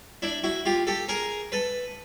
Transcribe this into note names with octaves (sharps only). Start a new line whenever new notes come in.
D4 E4
E4 F#4
F4 G4
G4 A4
G#4 A#4
A4 B4